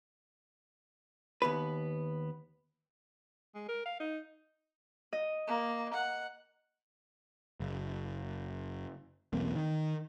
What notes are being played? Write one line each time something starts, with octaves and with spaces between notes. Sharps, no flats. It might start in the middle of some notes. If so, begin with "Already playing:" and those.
D#2 B3 B4
G#3
A#4
F5
D#4
D#5
A#3
F#5
F#1
B1 E2 A#3 C4
D#3